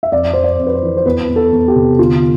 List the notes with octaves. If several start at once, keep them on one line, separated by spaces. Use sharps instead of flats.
E5
F2 D5
F2 C5
D5
F2
B4
C5
E3
C5
E2 B4
E2
A4
E2
G4
C3
D3 F4